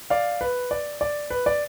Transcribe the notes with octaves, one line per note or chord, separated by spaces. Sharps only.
D5 F5
B4
D5
D5
B4
D5